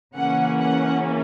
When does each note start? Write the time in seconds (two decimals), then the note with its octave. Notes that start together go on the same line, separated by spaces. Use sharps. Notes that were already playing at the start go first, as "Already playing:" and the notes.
0.16 C#3 E3 A#3 C#4 F#5
0.59 F#5